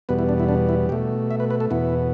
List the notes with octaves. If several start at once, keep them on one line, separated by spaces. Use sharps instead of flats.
E2 B2 G3 B3 B4
E4
D4
E4
D4
E4
B2 A3 G4
E5
B4
B4
A4
E2 B2 B3 E4